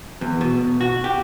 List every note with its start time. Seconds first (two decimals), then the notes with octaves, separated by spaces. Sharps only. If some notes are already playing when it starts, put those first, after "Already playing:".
0.21 E2
0.41 B2
0.81 F#4
1.04 G4